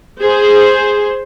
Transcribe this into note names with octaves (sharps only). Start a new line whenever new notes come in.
G#4 C5